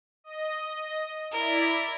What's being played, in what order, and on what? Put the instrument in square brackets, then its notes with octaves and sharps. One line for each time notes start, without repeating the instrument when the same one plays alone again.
[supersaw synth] D#5
[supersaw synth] E4 D5 B6 [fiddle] A#4